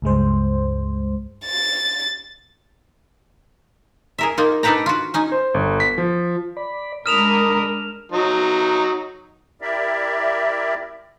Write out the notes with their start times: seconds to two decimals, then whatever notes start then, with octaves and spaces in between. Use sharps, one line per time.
0.02 C#2 G2 G#3 C5
1.46 A6
4.18 G#4 A#4 E5
4.38 A#3 D#4 F4
4.63 D4 D#4 A4 B4 G5 A#5
4.86 F4 F#4
5.14 C#4 D#4 G#5
5.32 C5
5.54 G1
5.80 B6
5.98 F3
6.57 D5 B5
7.06 G#3 D4 A#4 B5 D#6 F6 E7 F7
8.12 F#3 D#4
9.61 E4 G4 A#4 D5 E5